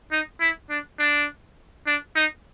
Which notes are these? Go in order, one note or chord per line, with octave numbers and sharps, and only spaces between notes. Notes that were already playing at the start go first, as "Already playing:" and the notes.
D#4
E4
D4
D4
D4
D#4